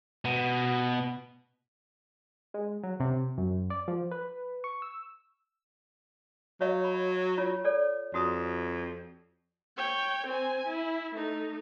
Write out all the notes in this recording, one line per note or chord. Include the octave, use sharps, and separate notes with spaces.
B2 B3
G#3
F#3
C3
F#2
D5
F3
B4
C#6
E6
F#3 C#5 D#5 F5
B5
F4 C#5
A4 C#5 D5
F2 F#4 D#6
C#5 G5
C4 G#5
E4
A3 D#4